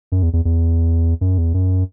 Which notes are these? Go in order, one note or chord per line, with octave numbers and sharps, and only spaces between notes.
F#2
E2
E2
E2
F#2
E2
F#2